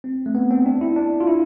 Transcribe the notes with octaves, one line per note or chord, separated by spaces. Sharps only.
C4
A3
B3
C4
D4
E4
D4
F4
E4